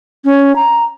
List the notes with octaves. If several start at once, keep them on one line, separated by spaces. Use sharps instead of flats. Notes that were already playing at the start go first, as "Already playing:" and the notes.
C#4
A#5